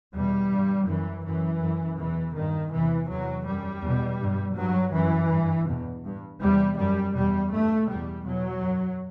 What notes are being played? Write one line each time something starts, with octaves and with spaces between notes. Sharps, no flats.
E2 B2 G3
G2
F#2 E3
F#2 E3
F#2
E2 B2 E3
G2 D#3
E2 C3 E3
E2 C3 F#3
F#2 G3
E2 B2
G2
G2 F#3
F#2 E3
G2
E2 B2
G2
E2 C3 G3
F#2 G3
E2 B2 G3
G2 A3
E2 B2 G3
E2 B2 F#3
F#2